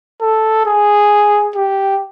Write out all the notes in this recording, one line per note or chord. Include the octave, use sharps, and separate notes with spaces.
A4
G#4
G4